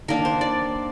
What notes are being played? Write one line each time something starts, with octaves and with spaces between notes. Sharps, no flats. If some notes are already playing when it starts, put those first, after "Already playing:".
D#3 A#3 D4 A#4
C5
D5